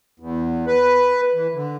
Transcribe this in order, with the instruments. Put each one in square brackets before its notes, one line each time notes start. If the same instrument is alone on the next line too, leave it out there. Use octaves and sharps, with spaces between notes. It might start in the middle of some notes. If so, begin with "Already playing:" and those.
[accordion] E2
B4
E3
D3